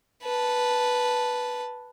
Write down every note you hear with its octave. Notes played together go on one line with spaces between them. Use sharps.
B4 A5